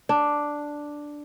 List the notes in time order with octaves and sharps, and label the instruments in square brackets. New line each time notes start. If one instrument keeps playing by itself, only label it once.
[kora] D4